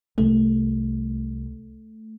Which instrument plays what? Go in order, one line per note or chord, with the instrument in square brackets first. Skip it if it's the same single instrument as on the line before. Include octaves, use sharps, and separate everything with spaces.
[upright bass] C2 [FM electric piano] A3